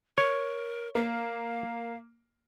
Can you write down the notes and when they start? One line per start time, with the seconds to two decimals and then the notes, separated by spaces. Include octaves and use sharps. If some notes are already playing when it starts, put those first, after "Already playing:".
0.18 A#4 C#5
0.95 A#3 F5